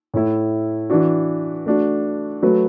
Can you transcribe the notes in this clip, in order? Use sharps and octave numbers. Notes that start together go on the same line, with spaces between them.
A2 A3 E4
E3 D4 F#4
A3 D4 F#4
F#3 A3 F#4 B4